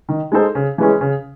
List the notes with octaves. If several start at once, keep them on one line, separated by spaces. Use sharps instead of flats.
D#3
G#3 D#4 A4 C5
C#3
E3 G#3 C#4
C#3